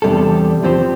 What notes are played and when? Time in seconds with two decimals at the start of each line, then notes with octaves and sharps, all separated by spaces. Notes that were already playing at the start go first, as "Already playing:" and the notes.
0.02 E2 C3 G3 D4 A4
0.63 F3 C4 G4 C5